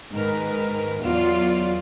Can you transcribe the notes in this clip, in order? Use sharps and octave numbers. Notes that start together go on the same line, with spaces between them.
G#2 D#3 A#4 B4
E2 F#3 F4 D5